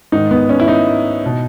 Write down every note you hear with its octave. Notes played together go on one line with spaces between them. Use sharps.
G#2 D#3 D#4
B3
C#4
E4
D#4
B2